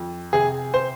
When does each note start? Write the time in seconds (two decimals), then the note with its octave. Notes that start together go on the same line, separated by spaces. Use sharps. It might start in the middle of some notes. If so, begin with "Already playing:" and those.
Already playing: F2
0.33 C3 G#4
0.74 C5